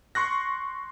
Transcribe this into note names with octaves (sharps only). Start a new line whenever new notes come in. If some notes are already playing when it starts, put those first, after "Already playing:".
C6 C#6 F#6 A#6